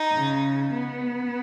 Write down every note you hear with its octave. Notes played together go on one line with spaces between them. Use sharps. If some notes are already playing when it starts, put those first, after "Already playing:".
Already playing: D#4
C#3
B3